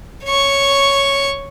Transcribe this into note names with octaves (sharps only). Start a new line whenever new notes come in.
C#5 C#6